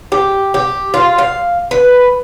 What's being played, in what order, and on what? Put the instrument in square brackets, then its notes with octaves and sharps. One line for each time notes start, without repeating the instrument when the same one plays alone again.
[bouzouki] G4
G4
F4
F5
B4